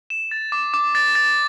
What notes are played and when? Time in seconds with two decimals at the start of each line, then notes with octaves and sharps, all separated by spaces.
0.10 E7
0.31 A6
0.52 D6
0.74 D6
0.95 A6
1.15 A6